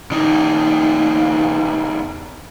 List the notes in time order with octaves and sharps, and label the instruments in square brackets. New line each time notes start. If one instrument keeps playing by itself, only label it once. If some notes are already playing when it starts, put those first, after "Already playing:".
[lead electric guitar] E2 D#4